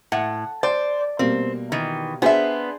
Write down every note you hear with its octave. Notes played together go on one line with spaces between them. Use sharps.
A2 F#5
C5 D5
B2 G3 A#3 C4
D#3 E3
B3 D4 G#4 C5 E5